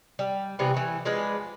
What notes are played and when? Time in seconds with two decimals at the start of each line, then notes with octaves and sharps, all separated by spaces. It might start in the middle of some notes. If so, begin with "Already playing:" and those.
0.19 G3
0.59 C3 E3 G3 B3
0.74 E3 A3
1.05 F3 G#3 D4 B4